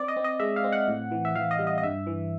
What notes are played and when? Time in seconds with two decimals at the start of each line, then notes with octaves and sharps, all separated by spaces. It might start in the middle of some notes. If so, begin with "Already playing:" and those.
Already playing: C4 D5
0.08 D#5
0.16 C4
0.24 D#5
0.40 G#3 E5
0.56 F5
0.64 C4
0.72 F#5
0.88 A2
1.11 E3
1.25 E5
1.35 E3 F5
1.51 D#5
1.59 G3
1.67 D#5
1.78 D#5
1.83 G2 E5
2.07 E3